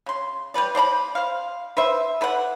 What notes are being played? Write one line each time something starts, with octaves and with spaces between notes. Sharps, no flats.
C#3 C6
G3 G#3 B4 D5
C5 D5 A#5 B5
C5 F5
B4 C5 E5
A4 B4 D5 F#5